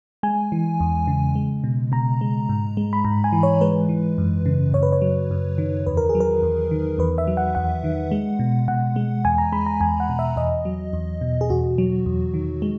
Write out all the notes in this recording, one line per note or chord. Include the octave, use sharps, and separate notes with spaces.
G#3 G#5
E3
E2
C#3
G#3
B2
B2 A#5
G#3
G#2
G#3
B5
G#2 A#5
G#5
E3
C#5
G#3 B4
E3
F#2
C#3
F#2 C#5
B4
C#5
F#3
F#2
D#3
E2 B4
A#4
G#4
F#3
A#4
E2
D#3
E2 B4
E5
F#3
F#5
E2 F#5
D#3
G#3
B2
B2 F#5
G#3
E2 G#5
A#5
G#3 B5
A#5
E2 G#5
F#5
B2
E5
E2 D#5
F#3
E2
B2
G#4
E2 F#4
F#3
E2
D#3
G#3